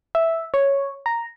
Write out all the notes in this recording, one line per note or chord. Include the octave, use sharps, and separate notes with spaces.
E5
C#5
A#5